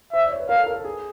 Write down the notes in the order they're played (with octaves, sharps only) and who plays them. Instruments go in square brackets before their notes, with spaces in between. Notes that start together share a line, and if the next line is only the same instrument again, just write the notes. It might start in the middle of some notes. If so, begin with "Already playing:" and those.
[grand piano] C5 [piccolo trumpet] E5
[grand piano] D5
C#5
B4
[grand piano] A#4 [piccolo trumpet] F5
[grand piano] A4
A#4
A4
G#4